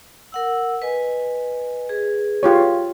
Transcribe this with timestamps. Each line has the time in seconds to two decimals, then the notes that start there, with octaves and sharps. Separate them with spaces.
0.32 A#4 F#5 E6
0.82 B4 D#5 G#5
1.89 G#4 B4
2.43 F4 G4 C#5